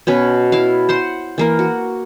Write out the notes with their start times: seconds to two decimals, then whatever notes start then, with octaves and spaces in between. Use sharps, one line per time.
0.07 B2 C#4 B4
0.52 E4 F5
0.89 C5 F#5 C6
1.38 E3 A#3 A#4
1.59 F#4